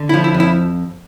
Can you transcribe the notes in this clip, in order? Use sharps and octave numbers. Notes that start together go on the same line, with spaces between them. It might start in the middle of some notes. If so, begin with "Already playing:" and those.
Already playing: D3
E4
F3
E4
F2
E4